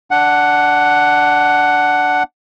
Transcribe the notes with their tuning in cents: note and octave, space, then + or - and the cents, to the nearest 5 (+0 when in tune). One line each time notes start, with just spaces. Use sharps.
D4 -5 F#5 +5